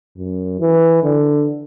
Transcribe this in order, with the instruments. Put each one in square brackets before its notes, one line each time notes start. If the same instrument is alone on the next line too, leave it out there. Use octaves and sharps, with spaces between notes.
[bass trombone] F#2
E3
D3